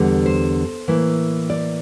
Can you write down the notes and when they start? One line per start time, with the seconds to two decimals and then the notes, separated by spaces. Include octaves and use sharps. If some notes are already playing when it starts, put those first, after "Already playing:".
Already playing: E2 D3 G3
0.26 C5
0.88 A2 E3 A#3 E4
1.50 D5